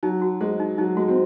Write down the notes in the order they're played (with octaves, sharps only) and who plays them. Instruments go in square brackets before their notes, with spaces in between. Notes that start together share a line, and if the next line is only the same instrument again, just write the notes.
[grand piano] F#3 [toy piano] D#4
[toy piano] F#4
[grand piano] G#3 [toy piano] C5
[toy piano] D#4
[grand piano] F#3 [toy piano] D#4
[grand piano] G#3 [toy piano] F#4
[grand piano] C4